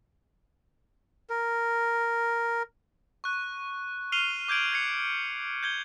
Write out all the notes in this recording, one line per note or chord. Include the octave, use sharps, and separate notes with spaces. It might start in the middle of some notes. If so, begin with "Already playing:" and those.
A#4
C#6 F#6
F6 C7 D#7 F7 G7
D6 G6 G#6 D7 F#7
G6 G#6 C7 C#7
G6 G#6 G7